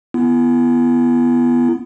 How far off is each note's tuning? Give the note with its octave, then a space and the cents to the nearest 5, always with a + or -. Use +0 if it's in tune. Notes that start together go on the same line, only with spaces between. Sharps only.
B3 +0 E4 +40